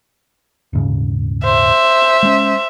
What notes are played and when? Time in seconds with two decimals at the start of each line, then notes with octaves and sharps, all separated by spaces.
0.73 D#1 G#2 C#3
1.45 C5 E5
2.23 G#3 C#4